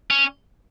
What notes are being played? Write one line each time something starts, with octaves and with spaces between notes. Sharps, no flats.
C#4